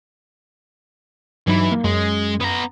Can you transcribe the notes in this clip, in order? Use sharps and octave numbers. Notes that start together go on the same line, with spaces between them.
G2 E3 F#3 D#4 E4
A#3
F#2 G#3
B3 A#5